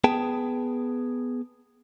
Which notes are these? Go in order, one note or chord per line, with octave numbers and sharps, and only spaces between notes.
B3 G#4 G5 A5